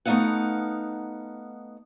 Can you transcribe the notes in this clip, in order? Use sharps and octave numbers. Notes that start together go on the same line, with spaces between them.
A3 B3 C4 D#4 F5 F#5